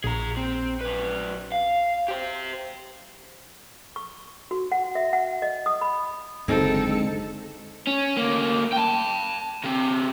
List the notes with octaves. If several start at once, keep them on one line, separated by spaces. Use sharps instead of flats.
A#1 G#4 A#5
C4
F#2 B4
F5
G4 C5
C#6
F#4
F#5
E5
F#5
D#5
D#6
B5
F#1 D#2 D3 G#3 C4 D#4 A4 C#7
C#4
D2 A#3
G5 A5
C#3 C4